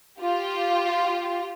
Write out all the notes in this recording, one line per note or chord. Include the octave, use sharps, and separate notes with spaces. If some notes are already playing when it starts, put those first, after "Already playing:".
F4 G4